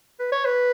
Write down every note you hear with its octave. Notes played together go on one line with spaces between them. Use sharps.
B4
C#5
B4